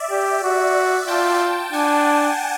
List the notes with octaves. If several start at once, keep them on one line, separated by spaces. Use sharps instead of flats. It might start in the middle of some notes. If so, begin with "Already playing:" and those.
Already playing: D5 E5
G4
F#4
F4 G5 A5
D4 F#5 G#5